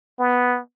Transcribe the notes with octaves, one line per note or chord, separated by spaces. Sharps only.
B3